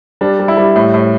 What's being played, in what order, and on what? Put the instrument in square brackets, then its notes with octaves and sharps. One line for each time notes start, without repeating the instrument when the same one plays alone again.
[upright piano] G3 D4
G3
E4
G3
A2
A2